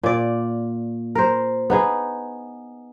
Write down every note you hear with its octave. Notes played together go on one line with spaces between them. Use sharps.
A#2 D5
A#4 C5
B3 D#4 G#4